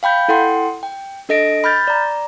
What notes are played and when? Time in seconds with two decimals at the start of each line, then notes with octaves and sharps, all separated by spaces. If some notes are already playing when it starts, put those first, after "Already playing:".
0.03 F5 G5 B5 G6
0.28 E4 A4 F#5 G5 C6
0.83 G5
1.29 D4 A4 D#5 A#6 D7
1.64 B5 F6 G6 A6
1.87 D5 A#5